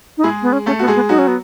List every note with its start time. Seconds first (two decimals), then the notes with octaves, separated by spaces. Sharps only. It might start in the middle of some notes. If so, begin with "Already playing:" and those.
0.18 D#4
0.23 G#3 E4 G#4
0.42 B3
0.53 C#4
0.66 A3 C#4 A4
0.79 B3 F#4
0.87 G#3 G#4
0.95 B3
1.09 F#3 D#4 F#4
1.18 C#4
1.27 B3